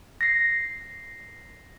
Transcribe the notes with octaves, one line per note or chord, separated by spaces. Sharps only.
A#6 C7